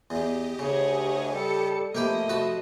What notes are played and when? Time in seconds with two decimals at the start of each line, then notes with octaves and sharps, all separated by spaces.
0.10 E2 G4 D#5
0.59 D2 C#3 G#4 C#5
1.33 G3 A4 C#7
1.95 C3 F3 A3 A#3 G4 D#5 B5
2.29 F#4 A5 B5